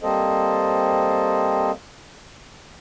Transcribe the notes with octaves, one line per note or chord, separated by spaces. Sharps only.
G3 A#3 C4 A4 C5 D#5